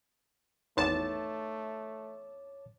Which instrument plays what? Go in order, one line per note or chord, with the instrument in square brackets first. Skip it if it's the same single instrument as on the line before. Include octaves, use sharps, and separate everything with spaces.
[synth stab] G#1 E2 A5 [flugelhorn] A3 [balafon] D#4 B4 [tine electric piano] C#5 D6